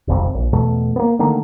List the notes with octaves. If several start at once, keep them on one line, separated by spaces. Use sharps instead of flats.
D#1 G#1 F2 C3
A#1
E2 B2 A3
A#3 B3
D3 D#3 A3 A#3